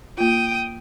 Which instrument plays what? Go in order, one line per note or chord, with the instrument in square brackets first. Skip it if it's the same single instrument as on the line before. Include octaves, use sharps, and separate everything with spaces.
[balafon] A#3 F4 [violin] G5 D#6